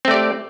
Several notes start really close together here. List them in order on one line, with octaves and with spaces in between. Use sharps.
C4 A3 D5 G4